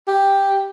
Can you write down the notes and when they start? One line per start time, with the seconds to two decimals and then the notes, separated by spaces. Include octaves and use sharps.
0.08 G4